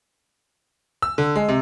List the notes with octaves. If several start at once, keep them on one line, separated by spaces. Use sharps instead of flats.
E6
D3
G#3
C3